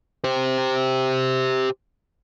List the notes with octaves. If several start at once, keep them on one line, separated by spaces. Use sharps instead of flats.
G4 C5